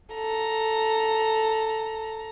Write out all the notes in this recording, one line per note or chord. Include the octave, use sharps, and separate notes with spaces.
A4 A#5